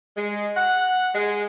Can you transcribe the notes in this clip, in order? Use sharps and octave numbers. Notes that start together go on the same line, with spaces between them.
G#3
F#5
G#3